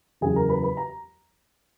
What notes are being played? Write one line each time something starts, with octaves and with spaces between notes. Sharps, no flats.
F#1 E2 C#3 F#3 G#4 G#5
A#4 A#5
B4 B5
B4 B5
A#5